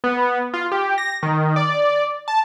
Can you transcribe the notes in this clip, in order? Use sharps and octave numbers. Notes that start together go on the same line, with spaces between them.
B3
F4
G4
A#6
D#3
D5
A5